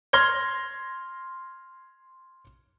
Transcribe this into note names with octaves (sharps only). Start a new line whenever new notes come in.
C6 F6 G#6 A#6 G7